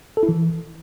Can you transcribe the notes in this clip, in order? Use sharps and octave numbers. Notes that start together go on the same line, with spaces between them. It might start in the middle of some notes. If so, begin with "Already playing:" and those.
A4
E4
E3